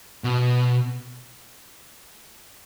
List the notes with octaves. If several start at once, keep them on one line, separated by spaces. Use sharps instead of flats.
B2